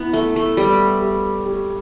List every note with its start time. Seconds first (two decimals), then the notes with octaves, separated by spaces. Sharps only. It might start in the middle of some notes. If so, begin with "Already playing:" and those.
Already playing: B3 E4
0.13 A3 E5
0.36 A3
0.57 G3 B4
1.02 G4
1.46 G4